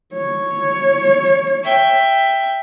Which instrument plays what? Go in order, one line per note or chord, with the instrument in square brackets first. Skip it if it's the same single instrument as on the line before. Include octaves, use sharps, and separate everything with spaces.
[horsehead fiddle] C#5
[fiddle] E5 G5